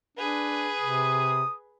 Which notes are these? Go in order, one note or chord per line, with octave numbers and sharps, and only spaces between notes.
D4 G#4 B4
C3 D#6